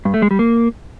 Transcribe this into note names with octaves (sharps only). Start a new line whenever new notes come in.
G2
A3
G#3
G3
A#3